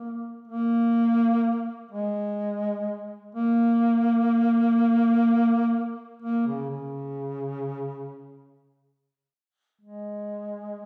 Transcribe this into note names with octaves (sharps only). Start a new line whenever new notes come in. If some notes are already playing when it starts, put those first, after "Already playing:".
Already playing: A#3
A#3
G#3
A#3
A#3
C#3
C#3
G#3